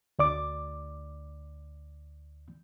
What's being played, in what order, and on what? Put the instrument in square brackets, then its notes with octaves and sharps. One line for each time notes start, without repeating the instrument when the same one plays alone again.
[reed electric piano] D2 D5 D6